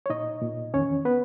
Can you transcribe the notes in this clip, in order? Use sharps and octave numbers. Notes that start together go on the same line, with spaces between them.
C#5
A#2 D#4 D#5
A#2
E2 D#3 C#4 C#5
B3 B4